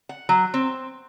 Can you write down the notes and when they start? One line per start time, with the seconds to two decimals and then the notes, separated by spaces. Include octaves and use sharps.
0.09 F#5
0.29 F#3
0.54 C4